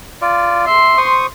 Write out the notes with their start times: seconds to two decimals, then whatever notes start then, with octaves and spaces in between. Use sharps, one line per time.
0.22 F4 D5
0.67 E5 C6
0.98 C5 C#6 D#6